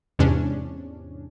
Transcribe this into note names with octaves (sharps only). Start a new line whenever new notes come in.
E2 G#2 C3 C#4 D4